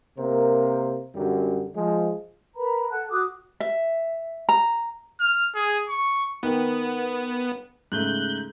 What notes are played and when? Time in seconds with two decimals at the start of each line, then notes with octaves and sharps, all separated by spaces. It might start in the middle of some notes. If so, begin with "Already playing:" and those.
0.18 C3 A#3 A#4 C5
1.15 F#2 D3 F#3 G3
1.75 F3 G#3
2.56 A#4 B4 A#5 B5
2.89 A4 F#5 A5 F#6
3.11 F#4 D6 D#6 F#6
3.60 E5
4.49 A#5
5.20 F6
5.55 G#4
5.89 C#6
6.43 D#3 B3 G5
7.92 G#2 C#3 A3 F#6 G6